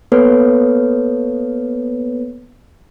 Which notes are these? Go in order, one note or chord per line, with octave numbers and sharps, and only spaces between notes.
A#3 B3 A4 B4 C#5